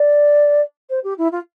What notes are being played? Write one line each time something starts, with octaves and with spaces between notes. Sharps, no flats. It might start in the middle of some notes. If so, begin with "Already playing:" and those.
Already playing: D5
C5
G4
E4
F4